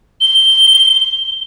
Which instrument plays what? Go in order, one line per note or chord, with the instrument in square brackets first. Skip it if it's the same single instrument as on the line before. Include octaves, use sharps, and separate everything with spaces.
[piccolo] G7